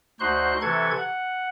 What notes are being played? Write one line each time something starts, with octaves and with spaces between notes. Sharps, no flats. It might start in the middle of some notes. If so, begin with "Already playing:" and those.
D2 D#4 F#4 C5 C6 F#6
C3 E3 A4 C#6 G#6
F#5